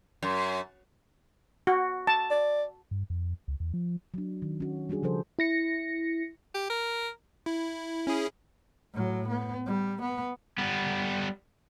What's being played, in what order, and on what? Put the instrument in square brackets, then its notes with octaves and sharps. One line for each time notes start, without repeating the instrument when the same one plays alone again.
[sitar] F#2
[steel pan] F#4
A5
[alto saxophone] D5
[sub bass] G2
F2
C#2
E2
F3
[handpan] F#3 D4
D#3
C#4 F#4
G3 D4 F#4 G#4
C#3 F3 A4 C5
[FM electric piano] E4 A#6 C#7
[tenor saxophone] G4
A#4
[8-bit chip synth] E4
C#4 E4 G#4
[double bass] A2 F#3
B3
G3
B3
[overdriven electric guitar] G3 B3